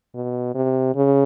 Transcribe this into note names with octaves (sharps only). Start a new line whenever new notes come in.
B2
C3
C#3